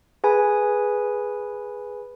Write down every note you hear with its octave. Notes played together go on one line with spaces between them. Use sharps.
G#4 B4 G#5 B5